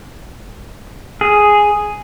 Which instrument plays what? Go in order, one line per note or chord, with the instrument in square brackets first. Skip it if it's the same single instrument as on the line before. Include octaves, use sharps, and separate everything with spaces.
[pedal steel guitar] G#4